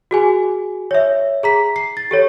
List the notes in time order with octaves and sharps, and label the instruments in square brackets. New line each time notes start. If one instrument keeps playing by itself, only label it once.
[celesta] F#4 G#4 G#5
C#5 E5
G#4 A#5 B6
C7
A6
G4 A4 C#5